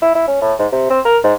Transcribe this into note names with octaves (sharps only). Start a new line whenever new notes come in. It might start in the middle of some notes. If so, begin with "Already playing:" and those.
E4
E4
C#4
A2
G#2
C3
C4
A#4
G#2